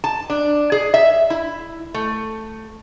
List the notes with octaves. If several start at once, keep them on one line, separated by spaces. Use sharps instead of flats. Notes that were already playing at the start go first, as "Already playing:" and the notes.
A5
D4
G#4
E5
E4
A3